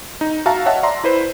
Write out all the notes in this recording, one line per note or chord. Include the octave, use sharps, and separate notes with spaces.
D#4
F#4 E5 F5 A5 A#5
C#5 D#5 E5 F#5 A5
D5 E5 A#5 C6
E4 B4 C5